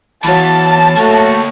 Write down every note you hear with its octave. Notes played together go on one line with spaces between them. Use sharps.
E2 E3 F#3 F5 A5 B5
A3 A#3 F#4 C#5